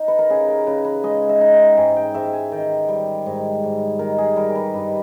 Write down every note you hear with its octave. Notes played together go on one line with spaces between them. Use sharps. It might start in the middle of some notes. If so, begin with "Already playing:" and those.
Already playing: D#4
B4
A#4
C#3 G#4
A#4
C#3 B4
B4
G#3 D#5
E5
D#4
G5
G#2 G#5
G5
G#2 E5
G#5
D#3 G5
G3
G#2
G#2
D#3 A#4
G#4
G3 A#4
A#4
B4
G2 D#5